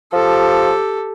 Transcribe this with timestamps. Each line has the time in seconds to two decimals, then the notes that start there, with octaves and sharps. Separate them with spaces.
0.13 F3 G4 A4